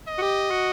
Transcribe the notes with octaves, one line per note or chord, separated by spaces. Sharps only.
D#5
F#4
G4
F#4